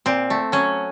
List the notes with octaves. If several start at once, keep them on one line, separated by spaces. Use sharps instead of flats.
A#2 C4
A3
F#3 C#4